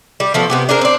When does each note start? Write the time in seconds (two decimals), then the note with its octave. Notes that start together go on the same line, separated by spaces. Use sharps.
0.20 G3
0.34 F3 A3 B3
0.50 C3 B3 G4
0.69 D4 G#4 A#4 C5
0.81 C4 D4